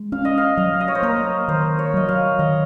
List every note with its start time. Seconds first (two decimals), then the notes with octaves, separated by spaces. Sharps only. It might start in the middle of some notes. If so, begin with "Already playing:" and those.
Already playing: G#3
0.12 C#4 F5
0.25 D#5
0.38 F5
0.57 F#3 D#5
0.81 D#5
0.88 C#5
0.95 C5
1.03 A#3 A#4
1.48 D#3 C5
1.79 C#5
1.94 F#3 D#5
2.08 F5
2.39 D#3 D#5